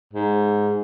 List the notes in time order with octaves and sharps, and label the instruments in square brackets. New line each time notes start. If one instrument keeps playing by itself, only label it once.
[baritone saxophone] G#2